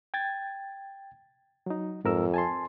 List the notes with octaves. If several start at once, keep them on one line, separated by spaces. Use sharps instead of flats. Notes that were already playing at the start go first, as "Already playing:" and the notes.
G5 G#6 A6
F#3 D#4
F2 G#2 A#4 E6
G#5 A5 C6